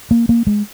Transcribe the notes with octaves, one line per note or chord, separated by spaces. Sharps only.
A#3
A#3
G#3